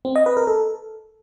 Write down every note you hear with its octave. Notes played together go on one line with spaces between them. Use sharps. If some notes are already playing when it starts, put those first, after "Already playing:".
C4
D#5
B4
A#4
A4